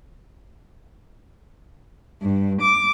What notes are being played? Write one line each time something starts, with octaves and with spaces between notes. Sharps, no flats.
G2
D6